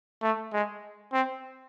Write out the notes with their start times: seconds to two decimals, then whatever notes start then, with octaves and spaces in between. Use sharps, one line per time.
0.23 A3
0.53 G#3
1.13 C4